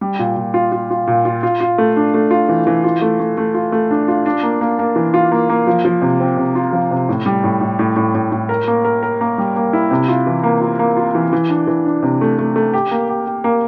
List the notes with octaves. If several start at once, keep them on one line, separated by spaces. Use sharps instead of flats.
G3
A#2
A#2
F4
F4
F4
A#2
F4
F4
F4
A3
D4
A3
F4
E3
E3
F4
A3
A3
A3
F4
A3
D4
F4
D4
A#3
A#3
A#3
E3
F4
A#3
A#3
F3
F3
C3
C4
C3
F4
F3
C3
A2
G3
A2
A2
A2
A2
A2
A2
A#4
A#3
A#4
A#4
A#3
G3
A#3
E4
C3
F4
E3
A#3
F4
A#3
F4
E3
E3
D4
E3
D4
C3
A3
A3
A3
G4
A#3
G4
G4
A#3